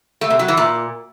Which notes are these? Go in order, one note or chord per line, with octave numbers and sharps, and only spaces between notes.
A3
C3
F#3
E3
A#2